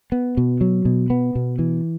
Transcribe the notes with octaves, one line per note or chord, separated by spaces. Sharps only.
B3
B2
F#3
B2
B3
B2
E3